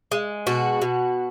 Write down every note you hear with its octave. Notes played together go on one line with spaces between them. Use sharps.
G#3
B2 F#4
B2